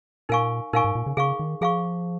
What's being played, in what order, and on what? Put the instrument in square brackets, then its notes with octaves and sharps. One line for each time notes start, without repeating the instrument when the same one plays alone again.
[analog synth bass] A#2 [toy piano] D#4 A#4 F5 G#5 C#6
[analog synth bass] A#2 [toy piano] D#4 A#4 F5 G#5 C#6
[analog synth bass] G#2
A#2
C#3
[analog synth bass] C#3 [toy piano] G#4 F5 C#6
[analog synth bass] D#3
[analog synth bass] F3 [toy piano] G#4 F5 C#6